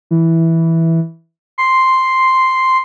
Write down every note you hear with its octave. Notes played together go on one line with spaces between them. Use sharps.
E3
C6